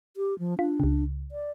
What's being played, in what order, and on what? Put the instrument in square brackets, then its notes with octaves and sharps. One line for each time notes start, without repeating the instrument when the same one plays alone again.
[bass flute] G4
F3
[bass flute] D4 [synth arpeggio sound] F4
[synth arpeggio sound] C#2 C#3
[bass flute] D5